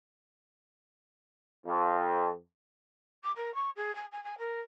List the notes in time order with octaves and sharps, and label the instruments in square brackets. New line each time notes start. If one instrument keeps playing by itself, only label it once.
[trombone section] F2
[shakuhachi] D6
A#4
C#6
G#4
G#5
G#5
G#5
A#4